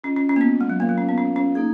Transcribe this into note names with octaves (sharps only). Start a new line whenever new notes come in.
C#4 F4 G#4 D#5
C#4
C#4
A#3
B3
G#3
F#3
A#3 F4 A#4 C#5 F5
F#3
C#4
B3
C#4
C#4
A#3 D#4 G#4